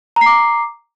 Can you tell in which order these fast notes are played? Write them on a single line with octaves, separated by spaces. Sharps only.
A#5 C7 D6